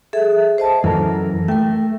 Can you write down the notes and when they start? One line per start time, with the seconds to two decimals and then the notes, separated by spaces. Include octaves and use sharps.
0.13 G#4 A4 E5
0.58 C5 D#5 A5
0.84 F#2 E3 A4 A#4
1.48 A3 A#4 G5